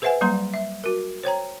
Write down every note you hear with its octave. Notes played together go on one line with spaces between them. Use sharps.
G#4 B4 C5 E5 F#5 G#5
F#3 G3 A#3 A#5 C6
E5
F#4 A#4
C5 C#5 G5 A#5